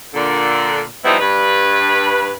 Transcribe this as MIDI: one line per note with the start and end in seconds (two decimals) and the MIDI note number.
0.14 0.82 46
0.14 0.82 50
1.05 1.15 53
1.05 1.15 55
1.05 1.15 59
1.05 1.15 60
1.05 1.15 63
1.05 1.15 64
1.20 2.34 43
1.20 2.34 71